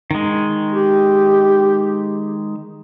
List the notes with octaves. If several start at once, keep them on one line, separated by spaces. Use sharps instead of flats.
D#3 G#3
G4